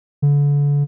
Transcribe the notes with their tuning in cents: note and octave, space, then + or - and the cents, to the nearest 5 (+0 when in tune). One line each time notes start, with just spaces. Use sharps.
D3 -35